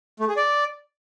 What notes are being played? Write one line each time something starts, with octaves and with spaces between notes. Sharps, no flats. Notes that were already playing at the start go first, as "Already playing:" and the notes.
A3
G#4
D5